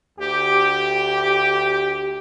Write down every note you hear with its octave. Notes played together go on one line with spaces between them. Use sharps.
D2 G4